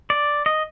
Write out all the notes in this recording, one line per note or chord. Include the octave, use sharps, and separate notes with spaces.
D5
D#5